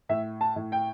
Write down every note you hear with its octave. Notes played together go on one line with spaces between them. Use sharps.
A2 E5
A5
A2
G5